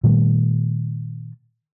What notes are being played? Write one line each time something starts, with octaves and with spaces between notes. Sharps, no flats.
A#2 D#3 G3 A3